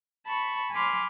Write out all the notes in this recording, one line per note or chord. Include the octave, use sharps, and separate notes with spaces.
A5 B5 C#6
G#5 B5 C6 D6 F6